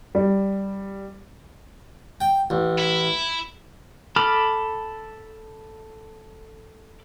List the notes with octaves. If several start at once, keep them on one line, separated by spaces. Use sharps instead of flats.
G3
G5
A1
E4
A4 B5 D6 F6